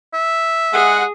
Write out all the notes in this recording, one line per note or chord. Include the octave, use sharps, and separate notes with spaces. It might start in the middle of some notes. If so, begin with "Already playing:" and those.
E5
G#3 G#4 F#5